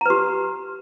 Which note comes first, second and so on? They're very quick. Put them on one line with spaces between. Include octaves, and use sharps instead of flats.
A#5 B4 G4